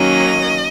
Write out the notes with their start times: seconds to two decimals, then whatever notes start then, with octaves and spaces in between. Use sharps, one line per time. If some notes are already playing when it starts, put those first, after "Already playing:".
Already playing: D#3 F#3 A#3 C#4 D#5